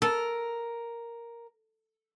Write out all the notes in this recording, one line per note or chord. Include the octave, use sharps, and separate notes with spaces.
A4 A#4